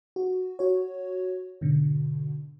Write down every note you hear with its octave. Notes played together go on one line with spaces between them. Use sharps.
F#4
F#4 C#5
G#2 B2 D3